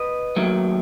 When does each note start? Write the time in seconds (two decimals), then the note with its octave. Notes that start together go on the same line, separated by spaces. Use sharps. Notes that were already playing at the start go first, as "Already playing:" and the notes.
Already playing: B4 D#5
0.36 D#2 D#3 F#3 A3